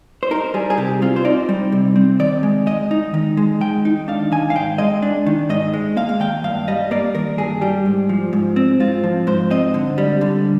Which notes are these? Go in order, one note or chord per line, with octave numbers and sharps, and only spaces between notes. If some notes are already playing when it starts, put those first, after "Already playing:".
C5
D#4 A#4
G3 G#4
G#4
C3 G4
C4 F4
C5
D#4 D5
G3
C3
C4
D#3 D5
G#3
D#3 D#5
D#4
D#3
G#3
D#3 G5
D#4
D4 F5
D#3 G#5
F5
G#2 G5
G#3 D#5
D4
D#3
G#2 D#5
G#3
A#3 F5
F5
D#3 G5
G2 F5
G3 D#5
A#3 D5
D#3 A#4
G2 G#4
G3 G4
G#2
F3
G#2
C4
G#2 F4
F3
G#2 C5
C4 D#5
D3
G3
D3